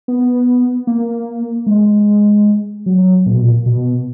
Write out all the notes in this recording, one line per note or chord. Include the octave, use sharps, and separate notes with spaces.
B3
A#3
G#3
F#3
A#2
B2
A#2
B2